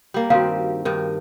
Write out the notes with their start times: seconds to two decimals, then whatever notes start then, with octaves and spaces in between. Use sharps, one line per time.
0.14 G3 A#3
0.30 G2 D#3 C4 F#4 F5
0.85 G2 D#3